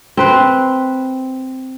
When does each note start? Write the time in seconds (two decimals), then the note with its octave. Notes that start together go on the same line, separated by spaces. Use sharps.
0.17 C4 B4 C5